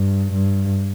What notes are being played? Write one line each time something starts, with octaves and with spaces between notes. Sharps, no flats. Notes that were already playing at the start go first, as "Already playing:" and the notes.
Already playing: G2
G2